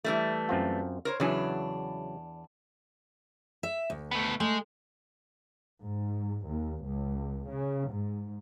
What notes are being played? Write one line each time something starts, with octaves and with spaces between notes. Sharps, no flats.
E3 G3 A3
F#2 C4 F4
A#4 C5 C#5
E2 C#3 E3 F#3 D4 G#5
E5
D2
A3 B3
G#3 A3
G#2
D#2
C#2
C#3
G#2